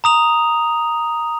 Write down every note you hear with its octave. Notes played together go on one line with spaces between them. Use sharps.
A#5 D#6 F7